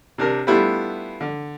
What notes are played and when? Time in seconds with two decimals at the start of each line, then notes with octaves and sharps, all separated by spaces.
0.18 C3 D4 A#4
0.47 G3 A3 B3 D4 E4 F4
1.21 D3